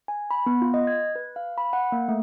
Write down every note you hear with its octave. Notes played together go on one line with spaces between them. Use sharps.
G#5
B5
B3
F4
D#5
G#6
B4
F5
B5
F#5
A#3
A3